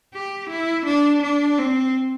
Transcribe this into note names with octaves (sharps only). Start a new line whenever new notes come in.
G4
E4
D4
D4
C4